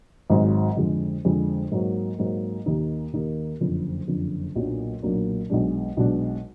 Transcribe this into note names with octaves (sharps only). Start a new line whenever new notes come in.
G#1 G#2 F#3
F2 D3 G#3
F2 D3 G#3
G#2 F#3 A#3
G#2 F#3 A#3
D#2 D#3 A#3 D#4
D#2 D#3 A#3 D#4
F#1 F2 D3
F#1 F2 D3
B1 A#2 F#3 A#3 D4
B1 A#2 F#3 A#3 D4
B1 B2 G#3 D4
B1 B2 G#3 D4